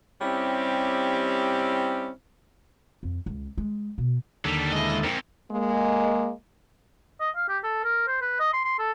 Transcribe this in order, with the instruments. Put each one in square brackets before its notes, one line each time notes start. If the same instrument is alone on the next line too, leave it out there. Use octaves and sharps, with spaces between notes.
[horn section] G3 C4 C#4 E4 G4
[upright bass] F2
C#2
G#3
B2
[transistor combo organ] D#2 D3 A4 [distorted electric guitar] F#3 G3
[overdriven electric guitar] G#3 E4 [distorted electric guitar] D#5
[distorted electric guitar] F2 [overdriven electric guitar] C4 A#4
[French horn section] G#3 A#3
[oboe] D#5
F5
G4
A4
A#4
C5
B4
D#5
C6
C6
A4